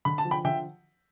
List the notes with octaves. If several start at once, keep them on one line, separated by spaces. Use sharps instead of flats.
D3 B5
A5
F3
G5 B5
D3 E5 G5